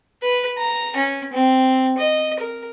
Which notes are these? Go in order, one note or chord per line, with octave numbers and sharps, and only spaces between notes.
B4
A#5
C#4
C4
D#5
A#4